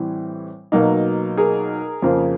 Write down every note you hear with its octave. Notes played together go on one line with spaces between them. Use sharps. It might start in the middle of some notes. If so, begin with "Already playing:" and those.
Already playing: A2 E3 G3 C4
B2 F#3 A#3 D#4
G#4 A#4
F2 C#3 F3 A#3